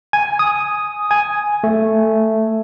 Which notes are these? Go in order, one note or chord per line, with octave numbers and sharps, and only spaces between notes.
G#5
D#6
G#5
A3